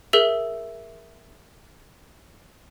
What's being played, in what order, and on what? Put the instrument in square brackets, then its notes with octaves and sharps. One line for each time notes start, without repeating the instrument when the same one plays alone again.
[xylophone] G#4 A#4 E5 E6 F7 G7